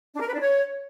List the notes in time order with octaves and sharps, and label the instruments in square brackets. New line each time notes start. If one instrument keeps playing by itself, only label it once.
[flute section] D4
A#4
B4
D4
C#5